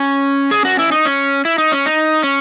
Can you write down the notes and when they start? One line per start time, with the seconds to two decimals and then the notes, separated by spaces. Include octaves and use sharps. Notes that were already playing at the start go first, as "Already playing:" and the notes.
Already playing: C#4
0.51 G#4
0.65 F#4
0.79 E4
0.92 D#4
1.05 C#4
1.45 E4
1.58 D#4
1.72 C#4
1.86 D#4
2.24 C#4